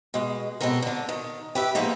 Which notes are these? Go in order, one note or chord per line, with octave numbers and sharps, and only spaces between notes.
B2 G#3
B2 D#3 G#3 C4 A4 A#4
D3 D4
D#3
G4 B4 E5
F3 G#3 A#3 B3 D#4